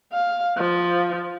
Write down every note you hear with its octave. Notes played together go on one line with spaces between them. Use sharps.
F5
F3